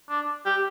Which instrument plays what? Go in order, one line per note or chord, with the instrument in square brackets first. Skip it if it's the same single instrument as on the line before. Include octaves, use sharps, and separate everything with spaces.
[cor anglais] D4
G4